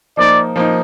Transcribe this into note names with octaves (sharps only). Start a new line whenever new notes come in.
F3 A#3 D#4 D5
F3 A#3 D#4